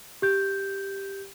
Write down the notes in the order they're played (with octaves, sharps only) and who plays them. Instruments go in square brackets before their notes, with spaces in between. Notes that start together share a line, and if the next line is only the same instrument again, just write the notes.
[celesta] G4 G6